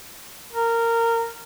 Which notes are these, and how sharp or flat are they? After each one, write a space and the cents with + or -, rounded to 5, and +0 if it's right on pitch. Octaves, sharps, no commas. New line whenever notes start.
A#4 -15